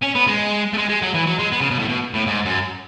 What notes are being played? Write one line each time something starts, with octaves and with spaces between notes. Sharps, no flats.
C#4
B3
G#3
A3
G#3
G#3
F#3
E3
F#3
G#3
B3
C#3
B2
A2
B2
A2
G#2
F#2